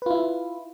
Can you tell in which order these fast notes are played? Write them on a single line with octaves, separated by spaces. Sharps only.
B4 F4 E4